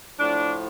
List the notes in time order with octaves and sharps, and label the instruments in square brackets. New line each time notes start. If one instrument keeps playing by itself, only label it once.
[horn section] A2 F3 D4